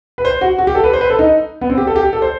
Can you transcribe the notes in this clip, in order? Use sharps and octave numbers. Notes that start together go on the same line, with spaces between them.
B4
C5
F#4
F#4
G4
A4
B4
C5
B4
A4
D#4
B3
C4
G4
A4
G4
A4
C5